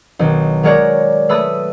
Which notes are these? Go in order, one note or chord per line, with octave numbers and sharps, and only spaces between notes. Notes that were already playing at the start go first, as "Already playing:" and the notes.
B1 D#3
F#3 G#3 A#4 C#5 D5
A3 B4 B5 D#6 A6